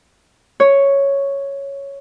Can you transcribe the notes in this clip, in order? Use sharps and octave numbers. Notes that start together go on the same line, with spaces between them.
C#5